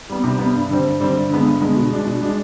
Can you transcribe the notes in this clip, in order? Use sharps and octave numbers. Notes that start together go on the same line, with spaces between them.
G3 B3
C3
G3 B3
G2
D3 G3 C4
G2
D3 G3 C4
G2
D3 G#3 B3
G2
D3 G#3 B3
B2
G#3 D4
B2
G#3 D4